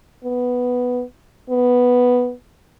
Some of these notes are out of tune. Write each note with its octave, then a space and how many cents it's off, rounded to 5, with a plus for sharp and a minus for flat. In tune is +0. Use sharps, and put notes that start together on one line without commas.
B3 +0
B3 +0